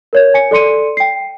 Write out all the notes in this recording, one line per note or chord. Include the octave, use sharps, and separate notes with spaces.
A#4 C#5 G#6
G#5 C#7
A4 D5 C6 C#7 D#7
G5 C7